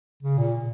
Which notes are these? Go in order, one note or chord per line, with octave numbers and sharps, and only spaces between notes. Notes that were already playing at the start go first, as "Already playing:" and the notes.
C#3
A#2